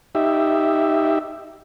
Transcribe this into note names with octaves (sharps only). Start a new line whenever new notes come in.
D#4 G4 E5